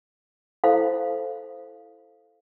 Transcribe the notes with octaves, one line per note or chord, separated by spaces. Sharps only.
E4 A4 C5 F5